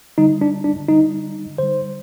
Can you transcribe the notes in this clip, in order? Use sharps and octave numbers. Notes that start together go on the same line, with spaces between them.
D3 G3 D#4
D4
D4
D3 G3 D#4
D3 G3 C5